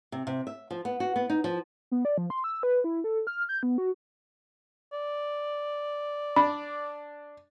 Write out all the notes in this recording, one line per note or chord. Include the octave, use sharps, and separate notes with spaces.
C3
C3
E5
F3
B3
F#4
B3
D#4
F3
B3
D5
F3
C6
E6
B4
E4
A4
F6
G6
B3
F#4
D5
D4 B5